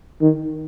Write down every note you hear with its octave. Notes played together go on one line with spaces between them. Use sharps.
D#3